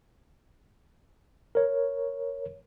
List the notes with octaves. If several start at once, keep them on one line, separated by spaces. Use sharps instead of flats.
A#4 C#5